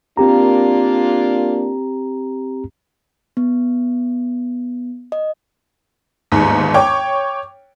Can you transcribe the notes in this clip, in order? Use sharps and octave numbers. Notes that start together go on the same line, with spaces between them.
A#3 C4 D4 F4 G4 A#5
B3
D#5
G1 D#2 G#2
C#5 G5 C#6 D6